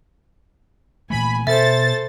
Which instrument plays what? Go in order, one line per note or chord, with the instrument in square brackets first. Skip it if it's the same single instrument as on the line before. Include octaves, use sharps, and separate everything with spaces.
[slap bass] A#2 E3 A3 [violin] G#5 [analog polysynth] B5
[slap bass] B2 [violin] A4 C5 [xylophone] E5 [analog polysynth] A6